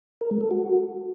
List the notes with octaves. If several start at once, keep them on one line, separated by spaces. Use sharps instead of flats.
A#4
G#3
A4
F#4